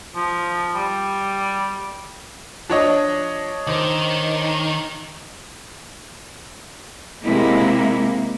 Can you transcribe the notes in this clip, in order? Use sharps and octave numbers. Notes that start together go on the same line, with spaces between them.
F3
G3
F3 D4 C#5 D#5
D#3 C5 D6
C3 G#3 A#3 E4